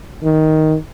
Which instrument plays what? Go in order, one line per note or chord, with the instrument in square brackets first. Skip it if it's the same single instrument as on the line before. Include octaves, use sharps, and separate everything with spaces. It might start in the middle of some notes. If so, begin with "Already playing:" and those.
[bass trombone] D#3